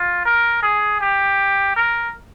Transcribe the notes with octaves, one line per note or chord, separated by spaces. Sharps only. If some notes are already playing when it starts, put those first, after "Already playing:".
Already playing: F4
A#4
G#4
G4
A#4